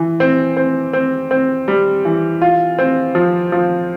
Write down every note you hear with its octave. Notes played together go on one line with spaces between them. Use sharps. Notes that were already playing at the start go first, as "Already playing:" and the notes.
Already playing: E3
C4
C4
C4
C4
G3
E3
F4
C4
F3
F3